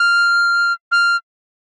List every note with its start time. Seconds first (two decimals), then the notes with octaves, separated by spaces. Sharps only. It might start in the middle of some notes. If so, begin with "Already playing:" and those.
Already playing: F6
0.92 F6